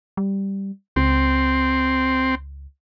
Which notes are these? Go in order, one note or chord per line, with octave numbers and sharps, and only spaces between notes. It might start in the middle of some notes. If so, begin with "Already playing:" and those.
G3
C#2 C4